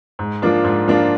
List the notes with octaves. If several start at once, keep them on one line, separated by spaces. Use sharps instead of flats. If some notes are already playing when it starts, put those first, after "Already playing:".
G#2
F3 A#3 D4 F4
G#2
F3 A#3 D4 F4